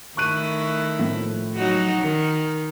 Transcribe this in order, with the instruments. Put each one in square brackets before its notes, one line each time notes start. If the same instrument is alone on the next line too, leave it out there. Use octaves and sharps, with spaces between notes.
[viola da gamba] D#3 A3 E4 [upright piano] C#6 F#6 D#7
[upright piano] A2 F3
[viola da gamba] F#3 D#4 F#4
[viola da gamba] D#3 [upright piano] C#7